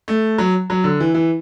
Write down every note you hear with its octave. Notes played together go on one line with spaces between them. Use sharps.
A3
F#3
F#3
D3
E3
E3